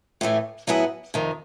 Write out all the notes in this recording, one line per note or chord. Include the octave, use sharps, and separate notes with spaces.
A2 E3 A3
A2 F#3 B3 E4 G#4
F2 C3 D#3